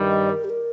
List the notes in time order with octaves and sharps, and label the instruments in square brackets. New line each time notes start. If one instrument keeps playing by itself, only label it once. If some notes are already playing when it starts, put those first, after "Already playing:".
Already playing: [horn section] G2 D#3 G3
[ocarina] D#5
A#4
G4
A#4